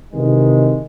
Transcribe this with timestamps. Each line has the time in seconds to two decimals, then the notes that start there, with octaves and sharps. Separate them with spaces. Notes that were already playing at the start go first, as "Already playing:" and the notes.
0.13 C3 D#3 E3 G#3